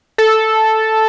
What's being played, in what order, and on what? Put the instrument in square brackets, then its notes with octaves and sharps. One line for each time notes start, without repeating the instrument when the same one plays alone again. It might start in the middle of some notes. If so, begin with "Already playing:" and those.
[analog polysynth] A4